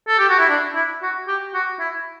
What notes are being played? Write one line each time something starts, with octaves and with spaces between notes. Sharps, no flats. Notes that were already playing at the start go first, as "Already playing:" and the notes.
A4
G4
F#4
E4
D4
E4
F#4
G4
F#4
E4